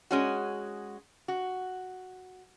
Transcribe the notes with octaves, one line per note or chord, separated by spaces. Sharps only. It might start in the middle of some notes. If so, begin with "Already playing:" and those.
G#3 C#4 F#4
F#4